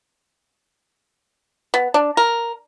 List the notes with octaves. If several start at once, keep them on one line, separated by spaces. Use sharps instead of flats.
B3
D4
A#4